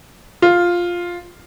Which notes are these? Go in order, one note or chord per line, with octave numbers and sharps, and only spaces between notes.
F4